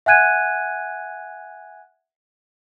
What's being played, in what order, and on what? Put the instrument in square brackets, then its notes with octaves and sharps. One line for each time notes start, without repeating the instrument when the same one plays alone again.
[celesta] E5 F#5 G#5 F#6 G#6 D#7